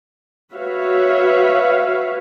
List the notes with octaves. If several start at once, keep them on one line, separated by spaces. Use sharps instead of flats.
F#4 B4 C#5 E5 F5